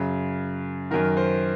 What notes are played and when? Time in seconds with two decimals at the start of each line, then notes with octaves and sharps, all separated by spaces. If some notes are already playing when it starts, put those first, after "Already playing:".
Already playing: F#2 C#3
0.91 F#2 D#3 A#4
1.17 C5